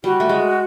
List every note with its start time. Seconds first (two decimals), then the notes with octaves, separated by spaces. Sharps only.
0.04 G3 F#4
0.20 A3
0.29 G#3